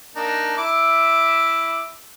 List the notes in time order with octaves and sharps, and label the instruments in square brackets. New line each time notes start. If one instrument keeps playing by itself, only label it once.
[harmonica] A#3 D4 D#4
[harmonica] E4 D6 [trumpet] E5